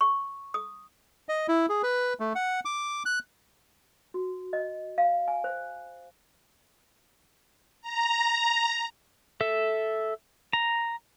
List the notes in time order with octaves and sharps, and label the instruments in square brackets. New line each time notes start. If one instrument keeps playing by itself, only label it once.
[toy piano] C#6
D#6
[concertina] D#5
E4
G#4
B4
A3
F#5
D6
F#6
[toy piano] F#4
D#5
F5
G#5
C5
[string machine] A#5
[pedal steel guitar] A4 E5
A#5